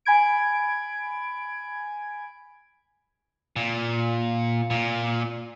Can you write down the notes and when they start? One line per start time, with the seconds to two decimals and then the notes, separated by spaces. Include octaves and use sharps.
0.05 G#5 B5 G#6 D7
3.56 A#2
4.70 A#2